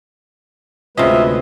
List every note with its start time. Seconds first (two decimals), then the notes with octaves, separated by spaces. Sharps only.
0.97 D2 C3 G#3 C#4 F4 B4 D#5 E5